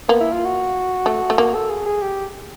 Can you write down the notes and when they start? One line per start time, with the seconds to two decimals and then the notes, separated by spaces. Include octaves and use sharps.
0.08 A#3 B3
0.21 E4
0.33 F4
0.45 F#4
1.06 A3
1.30 A3
1.38 A#3
1.54 A4
1.70 G#4
1.86 G#4
2.02 G4